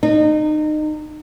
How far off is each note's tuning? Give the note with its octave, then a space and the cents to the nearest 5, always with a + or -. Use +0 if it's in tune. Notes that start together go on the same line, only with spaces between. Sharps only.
D#4 -30